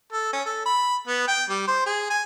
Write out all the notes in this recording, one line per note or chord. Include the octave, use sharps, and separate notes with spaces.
A4
C#4
A4
B5
B3
G5
G3
C5
G#4
G#5